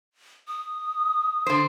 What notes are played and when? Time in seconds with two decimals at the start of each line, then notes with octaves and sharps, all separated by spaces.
0.48 D#6
1.46 D3 C5